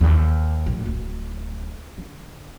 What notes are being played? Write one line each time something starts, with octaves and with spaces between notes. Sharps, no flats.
D#2
A#1 A2
D1
D3